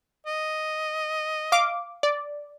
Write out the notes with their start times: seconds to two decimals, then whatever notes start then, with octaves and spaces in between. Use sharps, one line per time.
0.27 D#5
1.52 F5 D6
2.03 D5